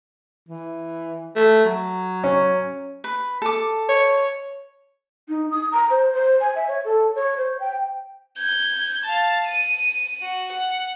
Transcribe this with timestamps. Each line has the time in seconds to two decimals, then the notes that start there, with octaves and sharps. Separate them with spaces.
0.49 E3
1.36 A3
1.65 F#3
2.24 C#4
3.04 B4
3.42 A4 D6
3.89 C#5
5.29 D#4
5.51 D#6
5.72 A#5
5.90 C5
6.13 C5
6.40 G#5
6.55 E5
6.68 C#5
6.85 A4
7.15 C#5
7.37 C5
7.60 G5
8.38 G6 G#6
9.04 F5 A5
9.47 D#7
10.22 F#4
10.52 F#5